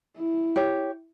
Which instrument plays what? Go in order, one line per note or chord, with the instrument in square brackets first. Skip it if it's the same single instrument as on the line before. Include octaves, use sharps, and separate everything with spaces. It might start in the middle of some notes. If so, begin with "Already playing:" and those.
[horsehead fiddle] E4
[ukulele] G4 C#5